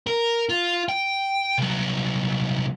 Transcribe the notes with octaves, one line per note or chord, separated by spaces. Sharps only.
A#4
F4
G5
C2 F#3